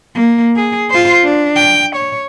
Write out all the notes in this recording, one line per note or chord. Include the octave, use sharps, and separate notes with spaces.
A#3
G#4
F4 C5
D4
G5
C#5